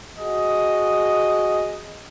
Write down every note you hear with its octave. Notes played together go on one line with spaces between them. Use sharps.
F#4 G#4 D#5